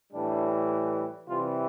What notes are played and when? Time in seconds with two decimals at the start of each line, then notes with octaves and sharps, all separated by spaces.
0.13 A2 E3 G3 D4
1.29 C3 E3 G3 F4